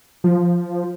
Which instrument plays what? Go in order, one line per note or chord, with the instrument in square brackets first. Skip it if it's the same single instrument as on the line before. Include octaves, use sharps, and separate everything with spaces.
[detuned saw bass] F3